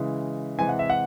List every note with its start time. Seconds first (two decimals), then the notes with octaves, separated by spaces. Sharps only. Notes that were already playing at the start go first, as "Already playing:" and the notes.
Already playing: C#3 E3 G#3
0.59 C3 E3 G#3 G#5
0.69 F#5
0.79 E5
0.90 F#5